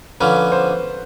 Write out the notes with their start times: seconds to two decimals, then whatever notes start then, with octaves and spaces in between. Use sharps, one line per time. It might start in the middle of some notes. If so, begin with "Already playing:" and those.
0.20 D3 F3 A#3 C#4 B4
0.52 C5